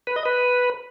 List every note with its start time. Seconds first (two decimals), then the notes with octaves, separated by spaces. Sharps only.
0.07 B4
0.16 D#5
0.25 B4